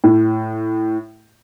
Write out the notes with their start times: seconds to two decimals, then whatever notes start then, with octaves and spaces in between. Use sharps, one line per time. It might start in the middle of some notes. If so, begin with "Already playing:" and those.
0.04 A2